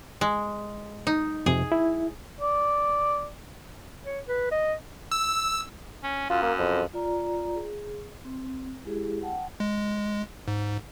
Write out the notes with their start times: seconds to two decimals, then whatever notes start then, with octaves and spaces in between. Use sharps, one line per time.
0.21 G#3
1.07 D#4
1.46 F2 C3 G#4
1.72 E4
2.41 D5
4.05 C#5
4.28 B4
4.51 D#5
5.12 E6
6.03 C#4
6.30 F#2 F4
6.42 A#3
6.59 F2
6.93 F4 D5 A#5
7.55 G#4
8.25 C4
8.85 G#3 E4 G4 G#4
9.23 F#5 G5 A5
9.60 G#3
10.48 G#2